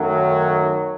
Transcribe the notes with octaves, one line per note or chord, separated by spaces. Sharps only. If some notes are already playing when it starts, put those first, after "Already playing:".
Already playing: F#2 D#3 F#3 A3